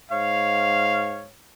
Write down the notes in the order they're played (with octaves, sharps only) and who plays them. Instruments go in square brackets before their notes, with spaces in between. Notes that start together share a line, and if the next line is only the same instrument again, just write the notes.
[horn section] G#2 C#5 F5